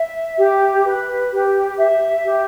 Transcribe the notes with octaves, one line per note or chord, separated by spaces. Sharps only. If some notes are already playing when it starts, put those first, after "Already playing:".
Already playing: E5
G4
B4
G4
E5
G4